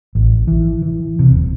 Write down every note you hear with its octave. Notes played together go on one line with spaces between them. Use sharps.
A1
E3
E3
C3
D#1